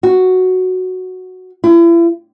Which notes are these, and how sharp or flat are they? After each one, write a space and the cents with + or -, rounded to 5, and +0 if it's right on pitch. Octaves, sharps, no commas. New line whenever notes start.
F#4 +0
E4 +40